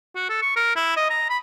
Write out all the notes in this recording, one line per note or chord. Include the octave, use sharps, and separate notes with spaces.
F#4
A4
C#6
A#4
E4
D#5
A#5
B5